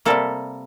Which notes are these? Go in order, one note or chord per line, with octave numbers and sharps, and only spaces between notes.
C3 G3 A#3 A4